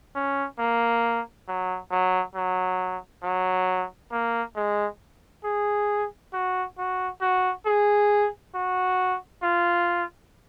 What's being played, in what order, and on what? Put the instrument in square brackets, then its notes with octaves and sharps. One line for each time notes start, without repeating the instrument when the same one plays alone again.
[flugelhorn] C#4
A#3
F#3
F#3
F#3
F#3
A#3
G#3
G#4
F#4
F#4
F#4
G#4
F#4
F4